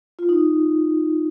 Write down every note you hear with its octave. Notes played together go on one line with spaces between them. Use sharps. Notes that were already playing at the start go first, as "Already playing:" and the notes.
F4
D#4